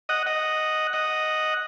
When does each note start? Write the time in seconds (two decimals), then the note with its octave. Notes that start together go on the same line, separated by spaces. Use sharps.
0.09 D#5 F#5
0.26 D#5 F#5
0.93 D#5 F#5